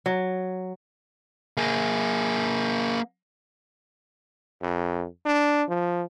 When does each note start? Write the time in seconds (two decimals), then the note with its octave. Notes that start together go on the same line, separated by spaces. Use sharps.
0.06 F#3
1.57 A#3 G#4
4.62 F2
5.26 D4
5.69 F3